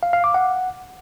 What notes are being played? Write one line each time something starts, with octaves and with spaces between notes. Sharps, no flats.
F5
F5
D6
F#5